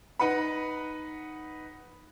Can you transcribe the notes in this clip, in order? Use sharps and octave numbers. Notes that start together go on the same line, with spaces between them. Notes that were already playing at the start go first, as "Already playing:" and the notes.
D#4 B4 F#5 B5